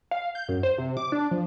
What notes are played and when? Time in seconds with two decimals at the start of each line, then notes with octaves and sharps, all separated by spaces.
0.11 F5
0.35 G6
0.48 F#2
0.63 C5
0.78 C3
0.97 D6
1.12 D4
1.31 F3